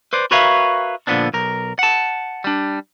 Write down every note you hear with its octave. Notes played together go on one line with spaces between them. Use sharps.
B4 C5 D5
F#4 A#4 B4 C#5 E5 F5
A#2 D3 F3 B3 C4 D4
B1 A#4
F#5 A5
G3 D4